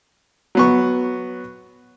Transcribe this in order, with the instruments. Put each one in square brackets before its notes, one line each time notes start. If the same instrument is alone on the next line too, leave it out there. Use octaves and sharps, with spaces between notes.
[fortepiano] F#3 B3 C#6